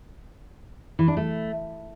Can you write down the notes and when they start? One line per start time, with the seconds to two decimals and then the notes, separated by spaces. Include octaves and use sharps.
0.99 E3
1.08 D4
1.17 A3